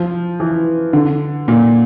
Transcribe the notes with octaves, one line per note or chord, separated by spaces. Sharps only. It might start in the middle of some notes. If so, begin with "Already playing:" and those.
Already playing: F3
E3
D3
A#2